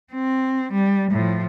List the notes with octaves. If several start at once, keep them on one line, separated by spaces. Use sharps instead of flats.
C4
G3
A2 F3